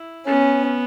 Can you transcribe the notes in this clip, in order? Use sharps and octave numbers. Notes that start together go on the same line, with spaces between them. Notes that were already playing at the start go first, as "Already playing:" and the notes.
Already playing: E4
B3 C#4